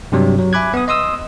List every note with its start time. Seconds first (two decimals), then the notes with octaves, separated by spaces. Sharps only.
0.12 G2 C3 F#3 G3
0.39 F#3
0.53 E5 G#5 B5 D6 F#6 G#6
0.74 B3 D#6
0.88 D#5 C6 D#6 E6